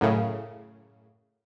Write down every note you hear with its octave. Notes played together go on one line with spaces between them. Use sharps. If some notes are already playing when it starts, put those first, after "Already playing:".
F#2 A2 C#3